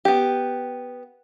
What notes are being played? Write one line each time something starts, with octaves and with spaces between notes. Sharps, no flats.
B3 G4